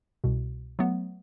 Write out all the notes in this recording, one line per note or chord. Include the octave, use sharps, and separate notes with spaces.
C2 B2
F#3 A3 B3